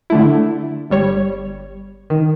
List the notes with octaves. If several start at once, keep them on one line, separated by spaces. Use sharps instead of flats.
D3 A3 E4
G1 G3 C#5
D#3